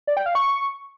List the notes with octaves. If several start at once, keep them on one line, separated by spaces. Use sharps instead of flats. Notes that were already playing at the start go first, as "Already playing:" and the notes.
D5
G5
F5
C#6